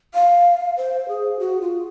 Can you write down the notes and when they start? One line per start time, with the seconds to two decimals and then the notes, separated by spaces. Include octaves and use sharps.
0.14 F5
0.77 C5
1.09 G#4
1.39 F#4
1.61 F4